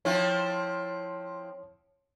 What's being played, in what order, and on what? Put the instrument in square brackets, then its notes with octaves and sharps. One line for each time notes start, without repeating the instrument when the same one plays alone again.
[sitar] F3 C4 E4 [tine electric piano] C#5